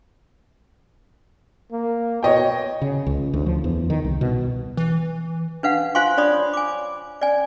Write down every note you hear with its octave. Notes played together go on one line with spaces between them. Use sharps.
A#3
B2 C#5 D#5 G5
C#3
C#2
D2
F3
E2
D#3
C2
B2
E3
D4 B4 F5 F#5
F4 C5 F5 G#5 C6 C#6
D4 C#5 D5 B5 D#6
G#5 D6
D5 G#5